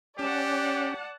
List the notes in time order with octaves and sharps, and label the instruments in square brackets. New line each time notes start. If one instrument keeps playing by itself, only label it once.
[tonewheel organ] C#4 [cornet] G4 [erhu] D5 [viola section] F#5 A5